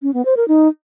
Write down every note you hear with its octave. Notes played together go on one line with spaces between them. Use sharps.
C#4
B3
C5
A#4
D#4